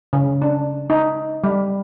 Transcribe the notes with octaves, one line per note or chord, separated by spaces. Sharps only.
C#3
D4
D#4
G3